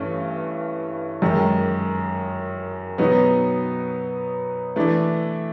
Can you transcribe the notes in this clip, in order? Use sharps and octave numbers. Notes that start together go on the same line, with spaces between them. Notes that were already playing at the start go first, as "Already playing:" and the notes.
Already playing: G2 E3 A3 C#4
F#2 D#3 G#3
B2 F#3 B3 D#4
E3 A3 D4